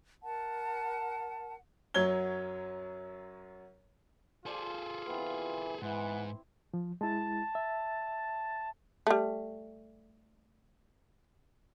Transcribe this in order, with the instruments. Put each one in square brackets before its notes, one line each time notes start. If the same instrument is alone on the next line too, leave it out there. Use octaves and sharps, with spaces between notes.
[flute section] A#4 F#5 A5
[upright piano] F#2 F#3 C#5 G#6 G7
[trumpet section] F4 [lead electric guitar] G#4 A4 [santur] C5 D5 A5
[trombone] E3 [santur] B3 C4
[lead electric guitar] G#2 [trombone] E3 [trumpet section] B3 F#5 [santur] E4 C6
[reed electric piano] F3
[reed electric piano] G#3 E4 [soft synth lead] A5
[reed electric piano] E5
[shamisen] G3 A3